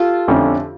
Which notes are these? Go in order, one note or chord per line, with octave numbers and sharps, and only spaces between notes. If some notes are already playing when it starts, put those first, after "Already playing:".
Already playing: F4 G4 A4
F2 D3 A3 C#4